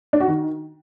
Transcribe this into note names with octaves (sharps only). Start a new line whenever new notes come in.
D4
F#4
D#3